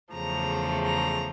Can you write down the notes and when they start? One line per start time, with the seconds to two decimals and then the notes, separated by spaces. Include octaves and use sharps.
0.13 E2 C#3 F3 A3 A#5
0.85 A#5